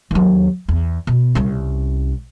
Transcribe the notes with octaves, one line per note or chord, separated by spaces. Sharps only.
D#2 F#3
E2
B2
C2 C#4